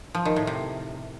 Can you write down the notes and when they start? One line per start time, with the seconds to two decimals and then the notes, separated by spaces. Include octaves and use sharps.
0.15 F3
0.25 D#3
0.36 A2
0.47 C3